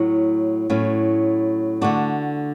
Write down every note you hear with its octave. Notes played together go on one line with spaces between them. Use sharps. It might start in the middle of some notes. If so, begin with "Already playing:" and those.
Already playing: A2 F#3
A2 F#3 C#4
D3 A3 D4 F#4